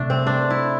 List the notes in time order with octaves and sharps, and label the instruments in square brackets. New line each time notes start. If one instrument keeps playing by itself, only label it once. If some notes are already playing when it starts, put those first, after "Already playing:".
Already playing: [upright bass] C3 [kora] A3 D4
[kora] C4
D4
E4